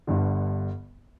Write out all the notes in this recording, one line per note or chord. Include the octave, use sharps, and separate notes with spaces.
G1 G2 D3